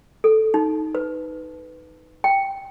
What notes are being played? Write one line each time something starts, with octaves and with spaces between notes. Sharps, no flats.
A4
D#4
B4
G5